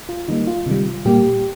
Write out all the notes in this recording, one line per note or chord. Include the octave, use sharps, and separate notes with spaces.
F4
D#3 G3 A#3 D#4
F4
C3 D#3 G3
A#2 G3 A#3 G4